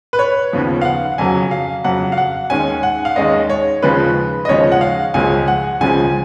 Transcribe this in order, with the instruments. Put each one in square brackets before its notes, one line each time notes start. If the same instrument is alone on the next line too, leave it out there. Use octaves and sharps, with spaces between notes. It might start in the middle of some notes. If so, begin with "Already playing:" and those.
[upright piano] B4
C#5
D#2 C#3 F3 B3
F5
F#5
F2 C#3 F#3 G#5
F5
F2 C#3 F#3 F#5
F5
F#5
D#2 D#3 G#3 C#4 G#5
F#5
F5
D#2 D#3 G#3 C#4 D#5
C#5
D#2 C#3 F3 G#3 B4
D#5
D#2 C#3 F3 G#3 C#5
F#5
F5
C#2 C#3 F3 G#3 C#4 G#5
F#5
C#2 C#3 F3 G#3 C#4 G#5